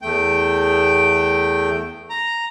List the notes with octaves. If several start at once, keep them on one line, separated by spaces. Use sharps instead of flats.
E2 A3 G5
A#5